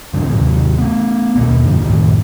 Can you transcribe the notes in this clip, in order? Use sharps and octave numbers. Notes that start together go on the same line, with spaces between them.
G2 C#3 G#3 D4
D#2 C3 D#3 F#3
A3 B3
D#2 B2 A#3
F#2 D3 F3
F#2 A2 C3 D#3